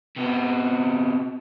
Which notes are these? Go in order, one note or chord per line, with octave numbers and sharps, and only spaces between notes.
C3 B3